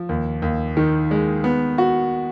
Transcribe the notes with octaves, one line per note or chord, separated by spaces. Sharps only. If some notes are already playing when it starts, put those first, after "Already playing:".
Already playing: F3
D#2
D#2
D#3
G#3
B3
F#4